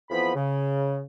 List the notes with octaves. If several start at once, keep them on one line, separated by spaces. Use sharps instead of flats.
F2 E3 F3 B3 B5
C#3